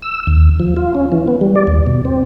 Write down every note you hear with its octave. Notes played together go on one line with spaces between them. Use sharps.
E6
D#2
F3
F4
C#4
E3
B3
G3
D5
D#2
B2
C4